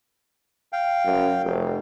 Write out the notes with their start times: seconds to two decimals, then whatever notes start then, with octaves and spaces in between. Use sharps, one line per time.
0.73 F5 G5
1.05 F#2
1.44 F1